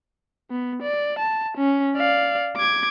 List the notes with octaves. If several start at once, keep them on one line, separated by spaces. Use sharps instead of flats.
B3
D5
A5
C#4
D5 F5
D6 G#6